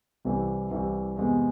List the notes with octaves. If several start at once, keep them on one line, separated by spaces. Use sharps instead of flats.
C2 C3 E3
C2 C3 E3
E2 C3 G#3